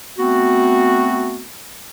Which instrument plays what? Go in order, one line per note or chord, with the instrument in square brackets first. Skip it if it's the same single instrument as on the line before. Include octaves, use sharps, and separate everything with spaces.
[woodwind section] A3 B3 C4 F#4